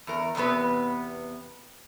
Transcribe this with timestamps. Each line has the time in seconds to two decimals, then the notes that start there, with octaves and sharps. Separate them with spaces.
0.07 E2 A#4
0.35 E2 C3 F3 B3 B4